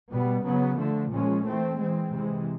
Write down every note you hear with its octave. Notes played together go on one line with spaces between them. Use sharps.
B2 G3 B3
C#3 F#3 B3
D3 F3 A3
A#2 F3 G#3 C#4
E3 A3 C4
E3 G#3 C4
C3 E3 G#3